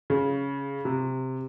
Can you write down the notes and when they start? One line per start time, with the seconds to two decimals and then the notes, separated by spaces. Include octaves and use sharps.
0.10 C#3
0.85 C3